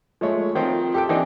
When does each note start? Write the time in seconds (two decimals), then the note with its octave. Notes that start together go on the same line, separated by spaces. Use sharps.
0.21 F3 G#3 A3 C#5
0.55 D#3 F3 C4 F4
0.94 G4 A4 G5
1.09 D#3 E3 C4 D4 D#4